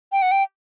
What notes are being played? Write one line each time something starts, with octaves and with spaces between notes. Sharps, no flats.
G5
F#5
G5